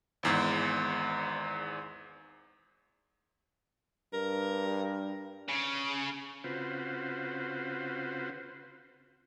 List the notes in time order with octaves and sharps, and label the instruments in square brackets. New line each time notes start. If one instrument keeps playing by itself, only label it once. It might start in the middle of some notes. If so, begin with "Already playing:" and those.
[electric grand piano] G#1 E2 G#2
[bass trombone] G2 [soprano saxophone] A#4
[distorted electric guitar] C#3
[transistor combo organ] C#3 C4 F4 F#4 B4 C5